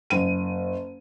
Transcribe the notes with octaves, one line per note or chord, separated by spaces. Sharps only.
F#1 D#7